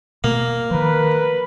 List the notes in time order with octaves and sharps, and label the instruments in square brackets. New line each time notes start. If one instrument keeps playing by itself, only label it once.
[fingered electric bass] B2 [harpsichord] A#3
[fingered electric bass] D#3 F3 [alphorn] A#4 [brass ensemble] B4